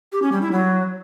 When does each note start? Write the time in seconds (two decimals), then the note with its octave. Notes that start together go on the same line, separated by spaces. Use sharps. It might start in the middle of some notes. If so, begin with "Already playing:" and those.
0.12 G4
0.22 C#4
0.32 G3
0.42 E4
0.52 F#3